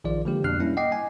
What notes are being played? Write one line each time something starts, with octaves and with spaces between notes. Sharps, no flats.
A#1 D#3 F3 F4 D5
D3 F3 G#3 A#3 G4
F2 B2 D4 F6 F#6 C7
G3 A#3 C#4 E4
D#5 F#5 G5 D6 C7
G#5